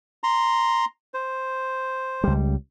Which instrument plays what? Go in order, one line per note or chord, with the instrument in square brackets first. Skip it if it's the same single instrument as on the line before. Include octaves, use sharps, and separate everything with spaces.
[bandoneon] A#5 C6
C5
[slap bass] C#2 G3